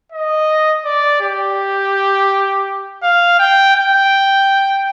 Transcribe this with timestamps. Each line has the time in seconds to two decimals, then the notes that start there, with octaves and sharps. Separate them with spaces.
0.12 D#5
0.85 D5
1.21 G4
3.03 F5
3.39 G5
3.75 G5